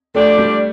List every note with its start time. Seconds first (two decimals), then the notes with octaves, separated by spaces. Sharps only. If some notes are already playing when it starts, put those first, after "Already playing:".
0.14 F3 A3 D4 G4 D5
0.38 G3